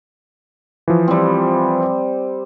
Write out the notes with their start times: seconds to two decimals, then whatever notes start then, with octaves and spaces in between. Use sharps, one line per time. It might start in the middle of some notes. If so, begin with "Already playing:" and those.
0.88 E3 F3
1.08 G3 C4